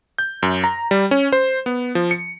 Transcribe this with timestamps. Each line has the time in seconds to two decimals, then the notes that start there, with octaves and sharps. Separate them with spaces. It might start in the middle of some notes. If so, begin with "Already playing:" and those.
0.18 G6
0.43 F#2
0.64 A#5
0.91 G3
1.11 C#4
1.32 C5
1.66 B3
1.95 F3
2.11 C#7